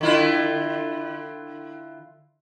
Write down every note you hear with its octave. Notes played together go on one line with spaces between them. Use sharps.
D3 E4 F4